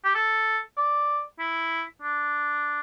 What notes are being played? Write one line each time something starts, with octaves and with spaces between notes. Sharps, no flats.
G4
A4
D5
E4
D4